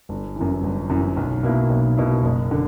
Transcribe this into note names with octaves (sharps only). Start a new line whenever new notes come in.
G1
F#2 E3
G1
F#2 E3
B1
B2 A#3 E4
B1
B2 A#3 E4
F#1
D3